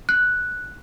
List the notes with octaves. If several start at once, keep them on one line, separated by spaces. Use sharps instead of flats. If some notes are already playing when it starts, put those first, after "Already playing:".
F#6